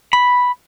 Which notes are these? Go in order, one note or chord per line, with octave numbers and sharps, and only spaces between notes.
B5